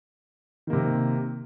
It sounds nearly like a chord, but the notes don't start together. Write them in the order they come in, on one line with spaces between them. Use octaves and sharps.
D#3 A#3 C3